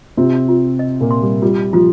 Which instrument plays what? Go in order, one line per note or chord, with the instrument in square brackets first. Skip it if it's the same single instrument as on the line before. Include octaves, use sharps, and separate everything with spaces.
[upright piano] C3 C4 [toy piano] F4
[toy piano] F4
D#5
[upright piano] A#2 A#3
[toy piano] C6
[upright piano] G3
[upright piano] G3 [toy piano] F4
[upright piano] F3 [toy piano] F4